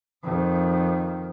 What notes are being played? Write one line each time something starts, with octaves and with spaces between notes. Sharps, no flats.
F2 D#3